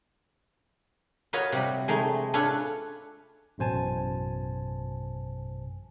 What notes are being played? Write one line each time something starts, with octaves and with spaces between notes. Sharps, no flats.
F4 F#4 B4 C#5 D#5
C3 G3 B5
G#3 A3 D#4
C#4 D4 F4 A4 B4 C#5
A1 F#2 B2 C5 G#5 A5